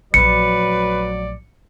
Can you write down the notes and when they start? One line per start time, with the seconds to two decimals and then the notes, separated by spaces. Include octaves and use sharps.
0.14 A#1 F#3 A3 B4 D5 C#7